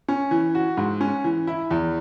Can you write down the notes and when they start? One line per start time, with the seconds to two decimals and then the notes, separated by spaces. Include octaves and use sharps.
0.08 C#4
0.31 E3
0.55 F#4
0.77 G#2
1.01 C#4
1.24 E3
1.47 E4
1.71 E2